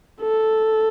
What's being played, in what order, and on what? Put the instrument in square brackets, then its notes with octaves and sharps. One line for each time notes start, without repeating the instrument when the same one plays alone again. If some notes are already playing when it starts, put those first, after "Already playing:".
[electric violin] A4